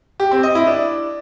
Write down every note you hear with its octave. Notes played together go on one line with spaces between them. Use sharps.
G4
C4
D#5
E4
D4